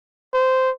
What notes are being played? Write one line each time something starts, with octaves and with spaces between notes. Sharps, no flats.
C5